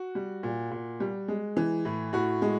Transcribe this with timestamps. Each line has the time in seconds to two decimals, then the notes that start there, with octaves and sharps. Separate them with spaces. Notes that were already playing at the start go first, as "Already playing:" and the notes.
Already playing: F#4
0.15 G3
0.43 A#2
0.71 A#2
1.00 G3
1.28 G#3
1.57 E3
1.85 A2
2.13 A2 F#4
2.42 G#3